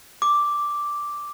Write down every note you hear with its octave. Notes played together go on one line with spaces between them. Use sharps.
D6